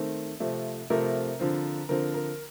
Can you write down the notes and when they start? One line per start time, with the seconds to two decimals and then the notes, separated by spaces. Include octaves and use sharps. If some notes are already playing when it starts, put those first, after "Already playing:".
Already playing: D#3 A3 C4
0.40 C3 F3 A3 C4
0.90 C3 F3 A3 C4 A#4
1.39 D3 F3 C4
1.89 D3 F3 C4 A#4
2.14 A#4